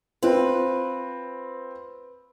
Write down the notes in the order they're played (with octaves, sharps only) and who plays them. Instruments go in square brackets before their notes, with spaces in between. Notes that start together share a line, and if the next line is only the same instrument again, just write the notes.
[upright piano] C4 F4 [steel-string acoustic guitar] B4